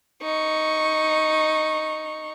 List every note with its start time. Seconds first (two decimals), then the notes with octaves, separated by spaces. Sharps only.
0.22 D#4 C#6